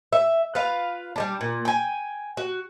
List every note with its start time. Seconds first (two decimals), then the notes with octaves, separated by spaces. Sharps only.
0.12 E5
0.55 F4 B4 F5
1.16 G3 G#3 D4
1.41 A#2
1.65 G5 G#5
2.37 F#4